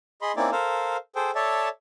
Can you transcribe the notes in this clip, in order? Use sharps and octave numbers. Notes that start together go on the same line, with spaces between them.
G#4 D#5 B5 C6
A#3 C4 C#4 D#4 E4 D5
A4 A#4 C5 F5
G#4 A4 C5 G5
A4 C#5 D5 E5 A5